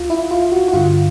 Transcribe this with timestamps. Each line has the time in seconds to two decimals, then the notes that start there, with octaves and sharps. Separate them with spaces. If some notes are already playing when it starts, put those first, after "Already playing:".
Already playing: C#2 F4
0.10 E4
0.31 F4
0.52 F#4
0.68 F#4
0.73 G2 D3 F4